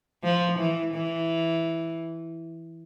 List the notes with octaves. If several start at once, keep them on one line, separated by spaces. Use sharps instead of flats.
F3
E3
E3